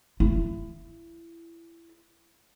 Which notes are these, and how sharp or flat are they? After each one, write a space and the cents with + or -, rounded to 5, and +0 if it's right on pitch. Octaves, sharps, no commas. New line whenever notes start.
E4 +20